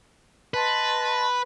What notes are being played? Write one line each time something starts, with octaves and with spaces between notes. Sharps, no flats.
B4 D#5 A5 C6